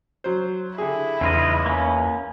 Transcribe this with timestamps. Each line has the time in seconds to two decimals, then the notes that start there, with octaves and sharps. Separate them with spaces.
0.24 F#3 C5
0.78 D3 E4 G4 G#4
1.21 A1 E2 C#3 D#4 F4 D#5
1.66 A#3 C#4